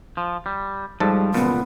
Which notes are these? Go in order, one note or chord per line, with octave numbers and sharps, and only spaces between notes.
F3
G3
G#2 F3 G3 A4 A5
E1 C#2 A#2 B3